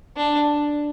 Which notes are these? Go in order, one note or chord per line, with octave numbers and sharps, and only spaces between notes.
D4